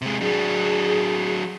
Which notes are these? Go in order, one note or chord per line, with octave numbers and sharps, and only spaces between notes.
C3 G#3
F#3 D4 G#4